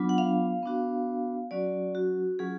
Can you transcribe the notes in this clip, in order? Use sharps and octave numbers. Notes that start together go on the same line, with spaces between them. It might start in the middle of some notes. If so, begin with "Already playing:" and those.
Already playing: F#3 B3 D4 F4
F#5
F5
B3 D4 F#4
F#3 C#4 F#4 D5
F#4
F#3 C#4 F4 G#4